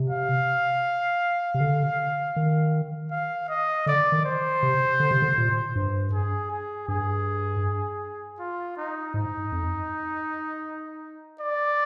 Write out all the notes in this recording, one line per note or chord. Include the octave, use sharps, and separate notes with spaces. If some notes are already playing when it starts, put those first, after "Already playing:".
Already playing: C3
F5
C3
D3
D#3
F5
D#5
D3 D5
D#3
C5
C3
D3
C3
D3
A#2
G2
G#4
G#4
G2 G#4
F4
D#4
G#2 D#4
F2
D5